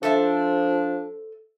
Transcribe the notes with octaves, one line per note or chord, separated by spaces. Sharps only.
F3 D4 A4 C5 E5